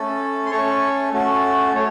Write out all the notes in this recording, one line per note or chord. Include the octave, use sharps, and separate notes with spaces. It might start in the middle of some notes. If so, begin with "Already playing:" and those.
Already playing: A3 C#4 A4
C6
A3 C#4 A4 C#5 C#6
A3 C#4 F#4 A4
A3 C#5